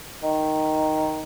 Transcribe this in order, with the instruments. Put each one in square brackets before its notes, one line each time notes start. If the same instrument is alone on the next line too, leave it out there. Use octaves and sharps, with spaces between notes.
[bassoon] D#3